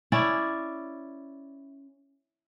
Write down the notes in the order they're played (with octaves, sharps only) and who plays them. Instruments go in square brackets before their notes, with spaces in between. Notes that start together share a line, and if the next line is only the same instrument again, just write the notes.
[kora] C#4 E4 D5